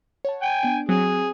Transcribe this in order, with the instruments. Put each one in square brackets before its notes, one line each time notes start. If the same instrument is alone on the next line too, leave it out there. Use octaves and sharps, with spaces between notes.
[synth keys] C#5 F#5 A5
[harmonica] G5 G#5
[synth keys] B3 D4 D7
[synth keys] F#3 C4 [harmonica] G#4